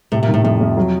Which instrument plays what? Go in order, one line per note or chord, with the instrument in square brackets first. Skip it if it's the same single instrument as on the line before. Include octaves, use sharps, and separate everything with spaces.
[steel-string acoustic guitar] A2 [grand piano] C3
[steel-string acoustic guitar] A#2
[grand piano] D#3
[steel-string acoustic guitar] A2
[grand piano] F2 [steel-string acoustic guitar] A2
[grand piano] F2
F#3